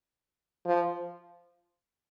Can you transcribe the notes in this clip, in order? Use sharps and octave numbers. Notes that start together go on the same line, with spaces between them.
F3